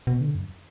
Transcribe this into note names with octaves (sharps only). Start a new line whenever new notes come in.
B2
D3
F#2